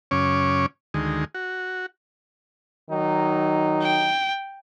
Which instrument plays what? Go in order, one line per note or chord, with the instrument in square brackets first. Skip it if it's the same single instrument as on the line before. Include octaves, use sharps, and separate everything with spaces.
[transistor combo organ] F#2 C#3 C#4 C#5 D6
D2 D#3 G#3
F#4
[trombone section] D#3 F#3 D#4
[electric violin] G5